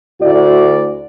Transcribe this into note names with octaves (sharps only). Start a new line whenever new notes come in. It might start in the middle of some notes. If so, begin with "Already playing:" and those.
D2 E4 F#4 D5